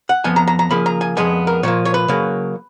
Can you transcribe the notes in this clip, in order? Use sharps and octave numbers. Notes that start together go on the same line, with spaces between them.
F#5
F2 F3 B3 G#5
A#5
A#5
A#5
C#3 F3 A#3 B5
A#5
G#5
F2 C#3 F3 G#3 B3 G#5
A#4
A#2 F3 A#3 C#5
C#5
B4
C#3 F#3 A#3